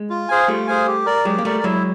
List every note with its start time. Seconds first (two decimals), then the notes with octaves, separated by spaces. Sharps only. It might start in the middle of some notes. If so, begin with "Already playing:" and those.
Already playing: G#3
0.10 F4
0.29 G#4 C5 F5 G#5
0.48 G3 A3 F4
0.67 G#4 C5 F5 G#5
0.87 G4
1.06 A#4 D5
1.25 F#3 G#3 G4
1.38 A#3
1.45 G3 A3 A#4 D5
1.64 F#3 G#3 E4